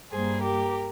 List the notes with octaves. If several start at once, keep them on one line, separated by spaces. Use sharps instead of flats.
G2 G3 A#3 G#4 C5
G4 A#4